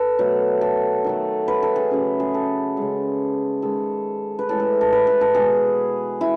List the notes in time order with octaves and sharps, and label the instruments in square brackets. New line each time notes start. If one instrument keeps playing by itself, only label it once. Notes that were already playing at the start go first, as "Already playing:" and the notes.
Already playing: [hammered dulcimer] A4 B4
B2 F#3 A3
A4
D#3 F#3 A3
B4
A4
G#4
C#3 F#3 A3
G#4
A4
C#3 G#3
D#3 G#3 A4
B4
A2 E3 G#3 A4
A4
A4
B4
A4
A4
B2 G#3 G#4
E4